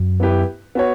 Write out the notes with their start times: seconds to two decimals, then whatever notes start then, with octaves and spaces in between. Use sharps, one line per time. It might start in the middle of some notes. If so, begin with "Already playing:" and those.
Already playing: F#2
0.20 B3 E4 G4 B4
0.75 B3 F#4 C#5